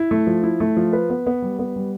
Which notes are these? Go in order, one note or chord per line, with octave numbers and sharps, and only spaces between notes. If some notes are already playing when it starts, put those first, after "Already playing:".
Already playing: E4
A3
F3
E4
A3
F3
B4
B3
B3
G3
B3
G3